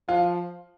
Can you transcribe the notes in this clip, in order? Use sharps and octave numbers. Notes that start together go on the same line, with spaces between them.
F3 F4